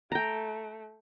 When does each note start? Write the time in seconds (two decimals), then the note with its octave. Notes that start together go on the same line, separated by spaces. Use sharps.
0.12 A3 G5 A#5